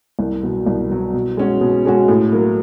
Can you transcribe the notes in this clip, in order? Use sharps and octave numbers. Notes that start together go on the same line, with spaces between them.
C2
B2 F#3
C2
B2 F#3
B2
G#3 C#4 F#4
B2
G#3 C#4 F#4
A2
F#3 A#3